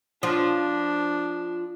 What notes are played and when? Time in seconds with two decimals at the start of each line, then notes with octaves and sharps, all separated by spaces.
0.23 F3 D4